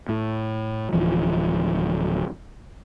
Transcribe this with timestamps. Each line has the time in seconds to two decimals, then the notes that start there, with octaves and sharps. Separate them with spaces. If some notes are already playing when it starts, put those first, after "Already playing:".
0.09 A2
0.93 D1 E3 F3